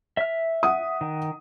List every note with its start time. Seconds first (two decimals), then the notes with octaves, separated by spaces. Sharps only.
0.17 E5 F6
0.63 F#5 D#6
1.01 D#3